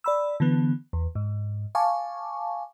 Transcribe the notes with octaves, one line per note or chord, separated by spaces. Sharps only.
D5 B5 E6
D3 E3 B3
E2
G#2
F5 G#5 A5 C#6 D6